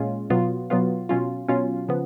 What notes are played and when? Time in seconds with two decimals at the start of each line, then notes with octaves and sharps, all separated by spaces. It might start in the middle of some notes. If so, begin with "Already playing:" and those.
Already playing: A#2 G#3 C#4 F4
0.30 B2 F#3 B3 F4
0.70 B2 F#3 B3 F4
1.09 B2 F#3 C#4 F4
1.48 B2 F#3 C#4 F4
1.88 C#3 F3 B3